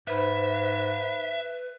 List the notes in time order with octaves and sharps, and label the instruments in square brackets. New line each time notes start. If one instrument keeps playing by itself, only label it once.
[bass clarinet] G#2 [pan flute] B4 [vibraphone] C5 B5 [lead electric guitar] E5